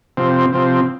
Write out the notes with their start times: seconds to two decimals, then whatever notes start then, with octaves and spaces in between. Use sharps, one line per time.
0.17 C3 F3 C4
0.53 C3 F3 C4